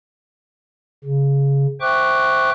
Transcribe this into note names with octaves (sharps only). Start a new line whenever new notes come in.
C#3
C5 E5 G5 C#6 D6 F#6